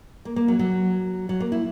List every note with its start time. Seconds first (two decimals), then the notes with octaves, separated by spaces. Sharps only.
0.25 A#3
0.36 A#3
0.48 F#3
0.59 F#3
1.29 F#3
1.40 A#3
1.52 E4